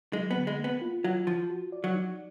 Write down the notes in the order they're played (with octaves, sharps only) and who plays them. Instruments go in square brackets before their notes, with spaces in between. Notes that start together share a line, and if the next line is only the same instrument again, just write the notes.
[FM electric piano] F#3 [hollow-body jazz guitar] G#3
[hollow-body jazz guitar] B3
[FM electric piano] D3
[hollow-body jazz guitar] G#3
[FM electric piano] A#3
[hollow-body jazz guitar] B3
[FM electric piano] F4
[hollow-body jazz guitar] F#3 [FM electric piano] F4
[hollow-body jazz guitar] F3 [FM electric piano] F4
[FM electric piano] F#4
D5
[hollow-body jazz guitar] F#3
[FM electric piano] D#4